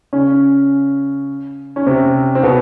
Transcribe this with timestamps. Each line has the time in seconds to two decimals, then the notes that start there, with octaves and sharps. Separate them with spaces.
0.13 C#3 C#4
1.76 C#4
1.86 C3 C4
2.35 C4
2.43 B2 B3